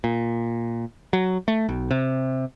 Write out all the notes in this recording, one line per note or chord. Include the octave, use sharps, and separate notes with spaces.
A#2
F#3
A3
B1
C3